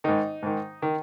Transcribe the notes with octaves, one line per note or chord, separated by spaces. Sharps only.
G#2 D#3 D#4
G#2 D#3
D#3